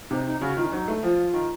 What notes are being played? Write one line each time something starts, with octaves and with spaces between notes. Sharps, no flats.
C3 D#4
D#4
C#3 F#4
D#3 F4
C#4
F#3 D#4
A3
F3 F4
D#3